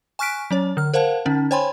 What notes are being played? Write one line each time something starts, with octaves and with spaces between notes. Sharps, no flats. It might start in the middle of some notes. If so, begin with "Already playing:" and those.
G#5 C#6 F6 F#6 B6 D7
F#3 C#4 C#5
D3 F6
A#4 C5 F5 F#5 A5
D3 C#4 D#4
C5 C#5 G5 G#5 B5 C6